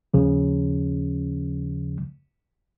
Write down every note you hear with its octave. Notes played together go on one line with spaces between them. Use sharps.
D#2 C#3 F3